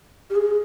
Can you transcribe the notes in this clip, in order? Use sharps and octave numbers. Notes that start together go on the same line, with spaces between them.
G4
G#4